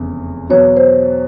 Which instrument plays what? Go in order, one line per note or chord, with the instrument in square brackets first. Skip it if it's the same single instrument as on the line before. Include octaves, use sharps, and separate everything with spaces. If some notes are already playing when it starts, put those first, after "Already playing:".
Already playing: [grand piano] F1 E2 C#3
[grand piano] E2 B2 F#3 B3 [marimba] C#5
[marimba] C5